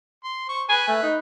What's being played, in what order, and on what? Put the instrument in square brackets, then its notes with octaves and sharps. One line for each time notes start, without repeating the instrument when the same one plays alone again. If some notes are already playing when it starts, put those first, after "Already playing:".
[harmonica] C6
C5 C#6
[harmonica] B4 [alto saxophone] G#5
[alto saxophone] A3
D#4